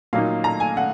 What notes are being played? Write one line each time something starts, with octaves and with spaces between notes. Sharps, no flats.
A#2 F#3 A#3 D#4 F5
A#5
G#5
F#5